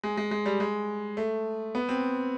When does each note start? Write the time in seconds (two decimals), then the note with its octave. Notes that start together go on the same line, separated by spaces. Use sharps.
0.03 G#3
0.17 G#3
0.31 G#3
0.46 G3
0.60 G#3
1.17 A3
1.75 B3
1.89 C4